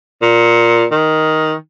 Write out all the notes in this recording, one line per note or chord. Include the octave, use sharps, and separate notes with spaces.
A#2
D#3